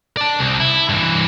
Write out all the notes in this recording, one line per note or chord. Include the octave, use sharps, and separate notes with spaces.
D5 A5
C2
E4
G2 E3